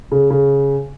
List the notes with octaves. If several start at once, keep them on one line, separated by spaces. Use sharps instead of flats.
C#3
C#3